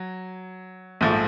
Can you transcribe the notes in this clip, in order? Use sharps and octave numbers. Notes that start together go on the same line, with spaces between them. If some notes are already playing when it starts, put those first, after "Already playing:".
Already playing: F#3
A#1 G#2 F3 A3